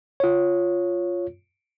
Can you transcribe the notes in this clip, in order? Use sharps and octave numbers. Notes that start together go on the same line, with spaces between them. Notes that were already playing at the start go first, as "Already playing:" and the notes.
F4 C#5